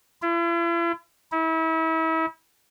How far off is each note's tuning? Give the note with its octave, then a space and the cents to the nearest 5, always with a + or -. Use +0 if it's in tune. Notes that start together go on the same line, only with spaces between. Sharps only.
E4 +45
E4 -35